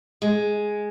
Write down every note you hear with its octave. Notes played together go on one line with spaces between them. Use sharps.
G#3